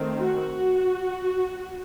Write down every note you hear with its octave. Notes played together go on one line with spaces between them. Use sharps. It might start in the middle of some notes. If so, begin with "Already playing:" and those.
Already playing: D#3 A3 C4
F#4